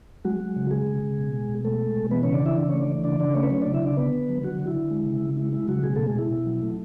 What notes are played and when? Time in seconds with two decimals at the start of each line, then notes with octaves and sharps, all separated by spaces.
0.24 F#3 G#3 F#4
0.40 G#3
0.56 C#3
0.71 G#3 G#4
0.87 C#3
1.03 C#3
1.19 B2
1.33 G#3
1.49 B2
1.65 G#3 A3 A4
1.79 G#3
1.96 B2
2.11 E3 B3 B4
2.23 C#3 C#4 C#5
2.34 D4 D5
2.42 E3 E4 E5
2.57 C#3 D4 D5
2.69 A3 C#4 C#5
2.81 D4 D5
2.88 E3
3.04 C#3 D4 D5
3.20 C#3 D4 D5
3.35 A3 C#4 C#5
3.43 B4
3.50 F#3 C#4 C#5
3.62 C#3 D4 D5
3.74 E4 E5
3.82 C#3 D4 D5
3.97 D3 B3 B4
4.13 D3
4.29 F#3
4.43 D3 F#3 F#4
4.60 D3
4.67 E4
4.75 D3
4.90 G#3
5.06 C#3
5.21 C#3
5.37 G#3 E4
5.53 G#3 E4
5.68 C#3 F#3 F#4
5.83 B2 G#3 G#4
5.96 B2 A3 A4
6.07 G#3 G#4
6.15 B2 E4
6.31 B2
6.46 F#3
6.62 A3